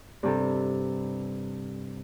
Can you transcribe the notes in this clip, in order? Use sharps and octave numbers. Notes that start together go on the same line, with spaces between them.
G2 C3 A4